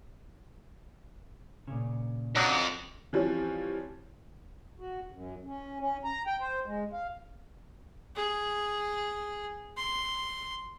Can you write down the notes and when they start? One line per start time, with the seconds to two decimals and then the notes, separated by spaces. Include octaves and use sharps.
1.67 A#2 C#3
2.36 F2 F#3 D4 D#4
3.13 E3 F3 G3 C4 C#4
4.80 F#4
5.12 F#2
5.47 C#4
5.80 C#4
6.04 A#5
6.27 G5
6.40 C5
6.66 G#3
6.93 F5
8.16 G#4
9.77 C6